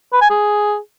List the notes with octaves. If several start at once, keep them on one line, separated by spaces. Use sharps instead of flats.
B4
G#5
G#4